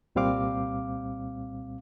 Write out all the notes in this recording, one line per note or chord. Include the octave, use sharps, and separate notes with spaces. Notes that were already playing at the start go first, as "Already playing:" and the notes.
C2 A#2 G3 C4 F5 D6